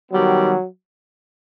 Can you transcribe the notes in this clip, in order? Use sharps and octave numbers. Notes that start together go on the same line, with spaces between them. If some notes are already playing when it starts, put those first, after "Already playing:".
D#3 F#3 G3 B3